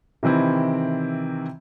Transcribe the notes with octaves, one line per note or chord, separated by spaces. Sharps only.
C3 D#3 E3 C4 E4